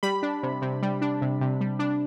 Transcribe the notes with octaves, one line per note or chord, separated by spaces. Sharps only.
G3 B5
D4
C3
C3
G3
D4
C3
C3
G3
D4